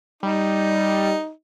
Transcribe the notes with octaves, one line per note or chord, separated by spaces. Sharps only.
G3 D#4